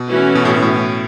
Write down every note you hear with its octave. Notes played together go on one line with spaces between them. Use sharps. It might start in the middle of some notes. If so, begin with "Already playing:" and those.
Already playing: B2
E3 A3 C#4 F#4
B2
A2
A2